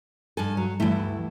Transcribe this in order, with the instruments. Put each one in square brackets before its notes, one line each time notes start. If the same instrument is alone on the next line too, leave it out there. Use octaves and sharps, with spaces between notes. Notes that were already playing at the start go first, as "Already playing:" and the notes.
[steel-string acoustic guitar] G2 G#5 [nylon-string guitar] A4
[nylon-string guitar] F#3
[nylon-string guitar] D2 G2 E4 [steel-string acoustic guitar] E3 A3